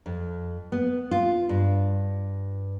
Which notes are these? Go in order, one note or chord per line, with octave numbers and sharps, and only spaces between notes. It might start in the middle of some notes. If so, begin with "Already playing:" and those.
F2
B3
F4
G2